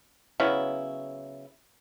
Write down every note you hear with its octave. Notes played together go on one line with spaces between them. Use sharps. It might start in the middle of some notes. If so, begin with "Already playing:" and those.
C#3 F#3 B3 E4